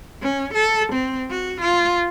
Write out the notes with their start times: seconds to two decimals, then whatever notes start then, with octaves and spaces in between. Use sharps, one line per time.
0.23 C#4
0.54 A4
0.93 C4
1.30 F#4
1.62 F4